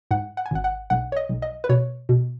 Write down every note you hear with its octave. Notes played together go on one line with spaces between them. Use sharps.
G#2 F#5
F#5
G#5
G#1 F#5
F#5
B1 F#5
C#5
D#5
B1
D#5
B4
B2 C#5
B2